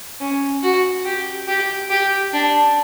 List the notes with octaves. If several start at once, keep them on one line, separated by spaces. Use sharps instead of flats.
C#4
F#4
G4
G4
G4
D4